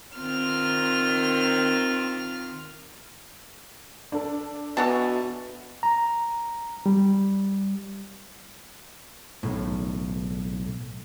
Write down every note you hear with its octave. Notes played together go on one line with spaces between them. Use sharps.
D#3 C4 F4 F6
D4 A4
B2 E3 F#4 A5
A#5
G3
B1 A2